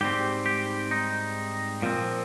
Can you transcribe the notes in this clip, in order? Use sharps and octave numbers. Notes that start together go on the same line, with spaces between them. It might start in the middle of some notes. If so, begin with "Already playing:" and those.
G#2 G3 C4 G4
G4
D#4
A#2 F3 C4